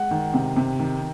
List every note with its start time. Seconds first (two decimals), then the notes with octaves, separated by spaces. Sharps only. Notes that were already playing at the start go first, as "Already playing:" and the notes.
Already playing: G#3 F#5
0.11 D#3
0.34 C3
0.56 C3
0.79 D#3